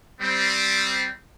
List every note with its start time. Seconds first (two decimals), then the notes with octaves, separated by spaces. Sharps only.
0.20 G3 C4